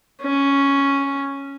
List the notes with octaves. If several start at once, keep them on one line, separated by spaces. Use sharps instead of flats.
C#4